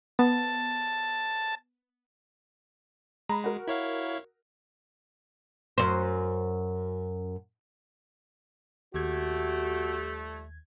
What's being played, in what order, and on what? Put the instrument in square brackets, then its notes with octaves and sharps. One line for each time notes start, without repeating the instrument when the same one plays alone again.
[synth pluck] B3 [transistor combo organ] A5
[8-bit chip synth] G#3 [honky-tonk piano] A#5 B5
[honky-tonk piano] F#4 A#4
[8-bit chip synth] E4 C#5 F5
[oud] F#2 C5
[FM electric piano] D#2 G#6 [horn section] F3 G3 A3 [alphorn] F#4 [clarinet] G4